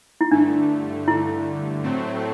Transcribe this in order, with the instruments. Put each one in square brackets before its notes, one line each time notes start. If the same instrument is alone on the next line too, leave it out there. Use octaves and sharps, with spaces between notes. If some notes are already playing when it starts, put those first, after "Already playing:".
[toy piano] E4
[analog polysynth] G2 D3 A3 [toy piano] D4
[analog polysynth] G2 D3 A3 [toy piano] E4
[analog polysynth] A2 F#3 A3 C4